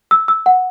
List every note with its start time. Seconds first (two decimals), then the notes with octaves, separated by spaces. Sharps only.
0.11 E6
0.28 E6
0.46 F#5